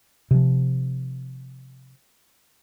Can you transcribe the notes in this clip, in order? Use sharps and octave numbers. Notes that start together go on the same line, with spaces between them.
C3 F3